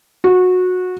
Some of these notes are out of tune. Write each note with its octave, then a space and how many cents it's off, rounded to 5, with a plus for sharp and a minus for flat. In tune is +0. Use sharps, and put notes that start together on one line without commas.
F#4 -20